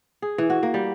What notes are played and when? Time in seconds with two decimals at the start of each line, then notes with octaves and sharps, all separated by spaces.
0.22 G#4
0.38 E3
0.50 F#4
0.63 A#3
0.74 G3